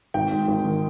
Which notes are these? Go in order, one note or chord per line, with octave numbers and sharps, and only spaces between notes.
G#1 G5
G#2
G#1
D#3